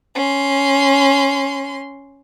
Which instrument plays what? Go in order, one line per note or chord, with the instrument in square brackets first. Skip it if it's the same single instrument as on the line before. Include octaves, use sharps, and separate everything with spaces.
[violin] C#4 C6